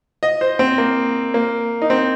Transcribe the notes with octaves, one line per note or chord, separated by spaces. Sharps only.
D#5
C5
C4
A#3
A#3
D#4
C4